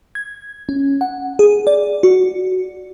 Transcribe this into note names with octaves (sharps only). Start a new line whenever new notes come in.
G#6
C#4
F#5
G#4
D5
F#4